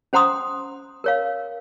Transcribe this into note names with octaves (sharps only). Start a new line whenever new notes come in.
C#4 C5 F#5 A#5 C6 D#6
A#4 C#5 F5